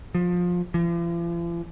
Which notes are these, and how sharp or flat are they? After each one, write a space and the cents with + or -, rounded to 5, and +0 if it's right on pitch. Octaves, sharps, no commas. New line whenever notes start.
F3 +20
F3 -45